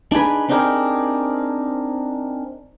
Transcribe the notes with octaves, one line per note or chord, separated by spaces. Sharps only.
D4 D#4 G#4 B4
C4 D4 D#4 G4 G#4 A#4